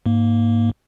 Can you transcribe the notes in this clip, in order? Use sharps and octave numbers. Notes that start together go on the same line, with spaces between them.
G#2 A#3